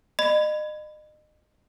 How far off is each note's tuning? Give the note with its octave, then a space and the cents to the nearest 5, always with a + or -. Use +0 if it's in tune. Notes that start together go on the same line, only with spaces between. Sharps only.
D#5 -35 B5 +25